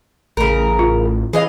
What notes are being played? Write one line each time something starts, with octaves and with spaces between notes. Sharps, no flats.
A1 C#3 A#4
F4
E3 G#4 D#5 F5